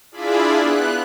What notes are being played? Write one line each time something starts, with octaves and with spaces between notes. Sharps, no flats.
D4 E4 F4 G#4 D5 B5
B3 F#6